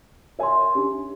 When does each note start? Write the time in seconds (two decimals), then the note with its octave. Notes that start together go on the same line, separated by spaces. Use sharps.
0.39 A#4 C#5 E5 G#5 C6
0.75 C#4 D4 G4